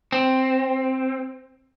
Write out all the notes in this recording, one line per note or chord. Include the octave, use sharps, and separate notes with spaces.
C4